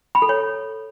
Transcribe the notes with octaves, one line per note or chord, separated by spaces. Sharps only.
B5
A4
C#5